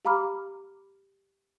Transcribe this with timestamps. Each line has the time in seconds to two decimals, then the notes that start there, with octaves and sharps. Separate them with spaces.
0.05 G4 F5 A#5 B5 D6 F6